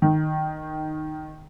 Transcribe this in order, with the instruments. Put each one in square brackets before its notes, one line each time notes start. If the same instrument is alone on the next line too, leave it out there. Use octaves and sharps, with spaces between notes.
[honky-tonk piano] D#3